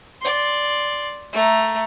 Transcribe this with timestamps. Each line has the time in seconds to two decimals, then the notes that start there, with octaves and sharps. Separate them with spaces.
0.21 D5 C6
1.33 A3 A#5